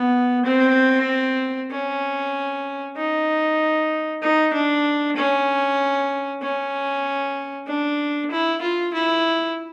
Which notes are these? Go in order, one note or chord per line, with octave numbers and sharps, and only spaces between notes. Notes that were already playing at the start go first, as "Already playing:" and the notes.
Already playing: B3
C4
C#4
D#4
D#4
D4
C#4
C#4
D4
E4
F4
E4